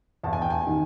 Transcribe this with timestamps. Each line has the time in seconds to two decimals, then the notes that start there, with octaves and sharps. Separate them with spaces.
0.23 E2 A5
0.33 G#5
0.42 G5
0.50 G#5
0.67 D#3